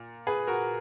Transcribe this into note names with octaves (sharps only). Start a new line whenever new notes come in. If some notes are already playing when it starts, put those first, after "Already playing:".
Already playing: A#2
G#4 B4
F#4 A#4